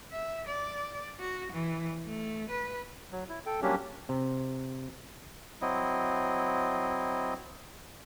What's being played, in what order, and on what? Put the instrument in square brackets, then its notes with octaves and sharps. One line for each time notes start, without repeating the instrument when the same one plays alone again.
[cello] E5
D5
F#4
E3
A3
B4
[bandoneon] F#3
E4
A4 G5
F#3 G3 A#3 C#4 D4 G4
[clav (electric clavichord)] C3
[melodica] F#3 C4 E4 D#5